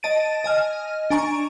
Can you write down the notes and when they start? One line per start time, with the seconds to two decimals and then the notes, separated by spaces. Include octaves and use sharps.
0.03 D#5 A5 A6 D7 D#7
0.44 D#5 G#5 F6
1.10 D4 G#5 A#5 C#6 D7